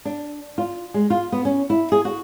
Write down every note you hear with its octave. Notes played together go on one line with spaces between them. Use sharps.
D4
F4
G#3
F4
B3
C#4
E4
G#4
F#4